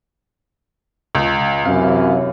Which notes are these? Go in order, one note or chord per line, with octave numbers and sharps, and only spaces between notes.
C#2
F#2 C3 E3 C#4 F5